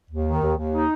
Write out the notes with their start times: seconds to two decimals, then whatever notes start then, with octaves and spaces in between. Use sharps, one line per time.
0.10 D#2
0.26 D#3
0.42 D#2
0.57 D#2
0.73 D#4